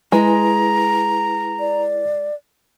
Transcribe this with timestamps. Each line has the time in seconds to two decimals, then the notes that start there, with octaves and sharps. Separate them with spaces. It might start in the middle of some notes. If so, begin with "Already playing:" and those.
0.12 G#3 E4 B4 G#5 A#5
1.60 D5